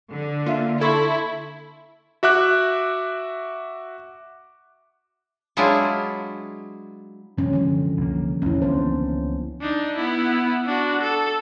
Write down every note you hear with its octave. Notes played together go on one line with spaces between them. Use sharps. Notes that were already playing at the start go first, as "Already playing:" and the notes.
D3
A#3 F4 E5
E4 A4 C6 C#6 G#6
F#4 E5 D6 F#6
F#3 G#3 D4 E4 F4 G#4
F#2 C3 E3 G#3 C#4
D3 F3 C#4
C2 A#3
A1 E2 C#4 E4
C#2 E3 A#3 B3 D4 C5
D4 D#4
B3 E4
D4 F#4
A4